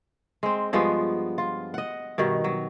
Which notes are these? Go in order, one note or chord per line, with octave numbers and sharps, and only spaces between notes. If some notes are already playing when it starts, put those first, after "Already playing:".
G#3 C4
G2 F3 G#3 B3
F4
D#5 F#5
G2 B2 D#3
F#3